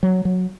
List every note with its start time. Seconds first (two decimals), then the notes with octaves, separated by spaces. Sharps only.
0.03 F#3
0.25 F#3